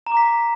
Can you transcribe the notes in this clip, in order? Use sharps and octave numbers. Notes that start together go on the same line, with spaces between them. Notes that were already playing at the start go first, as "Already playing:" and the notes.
A#5
D6
B6